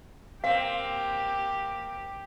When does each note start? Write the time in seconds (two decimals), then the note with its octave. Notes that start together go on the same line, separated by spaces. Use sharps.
0.44 A#3 C4 G4 F5